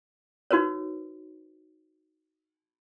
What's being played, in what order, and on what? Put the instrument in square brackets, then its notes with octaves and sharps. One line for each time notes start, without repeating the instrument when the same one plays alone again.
[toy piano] D#4 F#4 A#4 B4 C#5